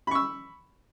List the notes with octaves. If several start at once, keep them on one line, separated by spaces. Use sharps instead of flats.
B5 C#6 E6